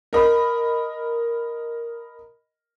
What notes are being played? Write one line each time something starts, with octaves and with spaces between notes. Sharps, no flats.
A#4 D#5 B5